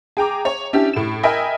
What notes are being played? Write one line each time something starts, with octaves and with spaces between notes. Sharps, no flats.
G#4 G5 A#5 D6
C#5
C#4 D4 E4 G4
A2 E7
A#4 D#5 E5 G5 G#5 B5